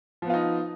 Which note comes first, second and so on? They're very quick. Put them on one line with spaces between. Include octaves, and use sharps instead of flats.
F3 B3 F4 D#4